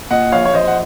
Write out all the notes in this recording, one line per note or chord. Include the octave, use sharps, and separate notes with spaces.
A#2 D#5 F#5
A#1 C#5 F5
C#5
A#1 C5 D#5
F#5